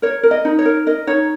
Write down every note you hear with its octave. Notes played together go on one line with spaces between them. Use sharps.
A#4 C#5
A#4
D#5
D#4
C#5
A#4
A#4 D#5
D#4 C#5